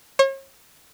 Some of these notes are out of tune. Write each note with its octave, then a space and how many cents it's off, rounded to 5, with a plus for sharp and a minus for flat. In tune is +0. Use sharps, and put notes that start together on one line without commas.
C#5 -40